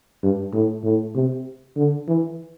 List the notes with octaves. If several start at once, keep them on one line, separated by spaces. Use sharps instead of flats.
G2
A2
A2
C3
D3
E3